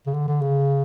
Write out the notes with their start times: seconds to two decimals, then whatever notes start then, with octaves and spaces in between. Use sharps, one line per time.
0.06 C#3
0.14 D3
0.28 D3
0.42 C#3